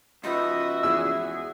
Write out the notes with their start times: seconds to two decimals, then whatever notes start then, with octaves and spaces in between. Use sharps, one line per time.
0.24 C#2 F3 F#4 B4 D#5 E5
0.83 E2 E4 G#4 E6